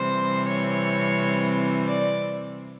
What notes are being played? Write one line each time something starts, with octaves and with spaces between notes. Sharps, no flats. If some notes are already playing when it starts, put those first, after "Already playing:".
Already playing: C3 E3 G3 C4 C5
C#5
D5